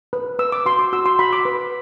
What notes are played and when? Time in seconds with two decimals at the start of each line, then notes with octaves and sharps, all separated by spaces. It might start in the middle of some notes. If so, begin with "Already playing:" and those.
0.13 B4
0.39 B4 E6
0.52 D6
0.66 F#4 C6
0.79 D6
0.93 F#4 E6
1.06 C6
1.19 F#4 B5
1.33 D6
1.45 B4